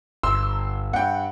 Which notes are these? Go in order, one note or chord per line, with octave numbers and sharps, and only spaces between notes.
G1 C6 E6
G2 F#5 G5